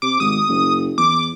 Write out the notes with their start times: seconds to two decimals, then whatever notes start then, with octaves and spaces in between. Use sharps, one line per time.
0.02 C3 D6
0.20 G#1 D#6
0.48 F#1
0.98 E2 D6